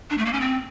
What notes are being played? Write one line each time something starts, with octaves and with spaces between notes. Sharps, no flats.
D4
A3
A#3
C#4
C4